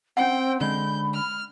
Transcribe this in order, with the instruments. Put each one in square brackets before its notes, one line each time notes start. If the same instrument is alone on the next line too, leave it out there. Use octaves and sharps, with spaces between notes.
[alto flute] C4 [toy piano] C#4 F#5 [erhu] G5
[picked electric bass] D3 G#3 [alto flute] B5 [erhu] G6
[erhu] F6